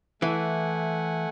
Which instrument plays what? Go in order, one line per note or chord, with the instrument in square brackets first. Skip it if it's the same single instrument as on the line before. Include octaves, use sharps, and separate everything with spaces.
[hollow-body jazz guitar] E3 [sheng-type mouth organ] A3 F#5 G#5